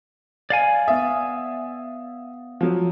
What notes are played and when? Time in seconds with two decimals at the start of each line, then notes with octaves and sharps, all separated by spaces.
0.50 D5 F5 G#5
0.88 B3 E5 D#6
2.61 F3 F#3